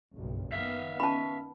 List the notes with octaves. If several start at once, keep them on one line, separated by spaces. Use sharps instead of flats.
F#1 B1 G2
D#3 B3 E5 F5
C#4 A5 B5